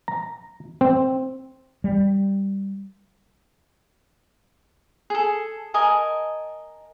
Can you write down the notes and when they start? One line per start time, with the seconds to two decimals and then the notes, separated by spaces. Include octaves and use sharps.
0.08 A#5
0.81 C4
1.84 G3
5.10 G#4 A4
5.74 A#4 D#5 G#5 A5